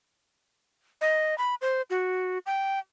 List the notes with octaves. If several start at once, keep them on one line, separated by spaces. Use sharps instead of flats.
D#5
B5
C5
F#4
G5